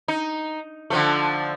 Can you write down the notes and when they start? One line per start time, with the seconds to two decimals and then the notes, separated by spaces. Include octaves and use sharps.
0.08 D#4
0.90 D3 F3 A3